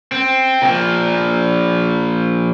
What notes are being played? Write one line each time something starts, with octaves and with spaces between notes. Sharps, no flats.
C4
A#2 F3